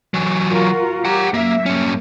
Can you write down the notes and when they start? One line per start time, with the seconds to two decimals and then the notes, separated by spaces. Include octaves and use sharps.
0.14 E3 F#3
0.48 F4 F#4 A#4
1.05 G4 F#5 A#5
1.34 F#2 A#3 E5
1.66 G2 A#3 C#4